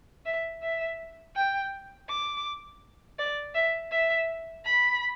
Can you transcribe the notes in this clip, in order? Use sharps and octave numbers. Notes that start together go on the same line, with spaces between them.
E5
E5
G5
D6
D5
E5
E5
B5